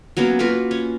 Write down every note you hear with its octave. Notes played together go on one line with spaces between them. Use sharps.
F#3 A#3 B3 C#4
A#3 F4 F#4 B4
C#4